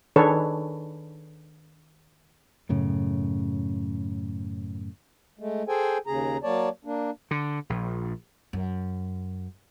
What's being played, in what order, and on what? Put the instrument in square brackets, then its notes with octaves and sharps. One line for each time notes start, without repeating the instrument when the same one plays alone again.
[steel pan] D#3 D4 G#4 A4 B4 C#5
[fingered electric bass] F#2 A2 C#3
[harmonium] G#3 A3
G#4 A4 C5 G5 G#5
D#2 C#3 G#4 A#5
F#3 A#3 C#5 D5 A5
A#3 D4
[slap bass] D3
A#1
[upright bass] F#2